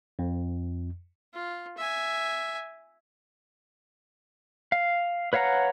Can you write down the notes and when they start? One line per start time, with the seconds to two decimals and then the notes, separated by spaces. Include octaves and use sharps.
0.19 F2
1.34 F4
1.77 E5 G#5
4.72 F5
5.33 B4 C#5 F5 F#5 A#5